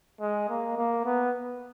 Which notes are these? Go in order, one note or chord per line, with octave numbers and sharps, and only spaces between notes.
G#3
A#3
A#3
B3